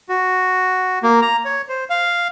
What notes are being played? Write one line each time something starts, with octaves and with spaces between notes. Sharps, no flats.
F#4
A#3
A#5
C#5
C5
F5